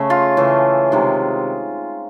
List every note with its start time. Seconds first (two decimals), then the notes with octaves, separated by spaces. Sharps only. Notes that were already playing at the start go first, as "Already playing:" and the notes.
Already playing: C#3 A3
0.10 F4
0.37 C#3 E3 A3
0.92 C3 D#3 G#3